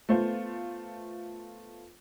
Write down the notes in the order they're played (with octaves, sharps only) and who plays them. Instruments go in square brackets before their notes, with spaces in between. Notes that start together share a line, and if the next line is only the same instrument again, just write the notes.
[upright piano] A3 B3 F4 C5